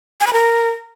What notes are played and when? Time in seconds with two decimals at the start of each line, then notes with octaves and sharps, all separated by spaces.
0.20 G#5
0.27 B5
0.33 A#4